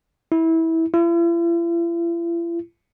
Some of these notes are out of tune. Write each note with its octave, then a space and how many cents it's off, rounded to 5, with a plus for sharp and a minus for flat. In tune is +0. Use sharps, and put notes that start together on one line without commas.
E4 -20
E4 +45